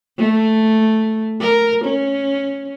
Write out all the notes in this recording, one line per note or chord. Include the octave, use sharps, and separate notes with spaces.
A3
A#4
C#4